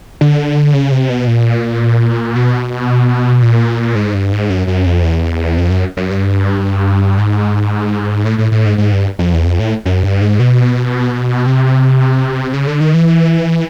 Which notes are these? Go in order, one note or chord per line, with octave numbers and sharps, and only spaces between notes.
D3
C#3
C3
B2
A#2
B2
A#2
G#2
G2
G#2
F#2
F#2
F2
E2
F2
F#2
F#2
G2
G#2
A2
A2
A2
G#2
G#2
G2
F2
E2
F2
A2
F#2
G2
G#2
B2
C3
C#3
D3
D#3
E3